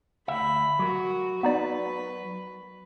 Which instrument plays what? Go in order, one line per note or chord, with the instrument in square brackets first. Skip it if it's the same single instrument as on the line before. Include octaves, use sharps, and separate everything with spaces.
[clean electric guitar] D2 E5 [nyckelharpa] B5
[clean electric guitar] F#3 A#4 [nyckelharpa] F#4
[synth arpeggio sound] B3 D#4 D5 [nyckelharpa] B4